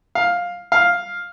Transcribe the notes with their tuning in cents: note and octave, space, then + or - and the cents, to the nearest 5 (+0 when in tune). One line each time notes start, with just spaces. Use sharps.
F5 +10
F5 +5